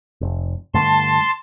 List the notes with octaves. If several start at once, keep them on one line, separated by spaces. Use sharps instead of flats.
F1
G2 D3 A3 A5 C6